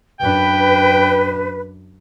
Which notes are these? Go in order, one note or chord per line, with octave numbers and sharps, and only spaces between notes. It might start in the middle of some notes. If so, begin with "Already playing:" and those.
F#2 D4 B4 G5